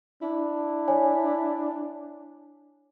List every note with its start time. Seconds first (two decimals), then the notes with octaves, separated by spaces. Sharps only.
0.22 D4 E4
0.88 C#5 G#5